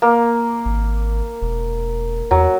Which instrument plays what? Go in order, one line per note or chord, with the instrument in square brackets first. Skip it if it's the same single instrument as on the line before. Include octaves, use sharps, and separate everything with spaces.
[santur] A#3
[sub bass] G#1
E1
[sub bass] E2 [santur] F#3